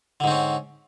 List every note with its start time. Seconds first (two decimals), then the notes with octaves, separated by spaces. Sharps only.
0.20 D3
0.24 G#2
0.27 C4
0.31 C#4